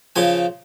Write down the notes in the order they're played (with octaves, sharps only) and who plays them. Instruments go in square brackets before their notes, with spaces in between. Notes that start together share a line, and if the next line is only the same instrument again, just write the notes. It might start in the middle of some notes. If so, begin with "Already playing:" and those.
[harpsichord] C#3 F3 G#5